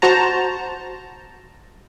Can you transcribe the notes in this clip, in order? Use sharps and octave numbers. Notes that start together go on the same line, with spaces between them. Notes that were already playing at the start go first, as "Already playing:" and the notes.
F#4 C5 A5 A#5